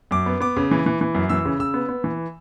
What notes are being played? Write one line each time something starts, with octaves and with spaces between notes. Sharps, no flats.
F#2 D6
B3
B3 D6
C#3
E3
E3
E3
F#2
E3 E6
C#3
C#3 E6
B3
B3
E3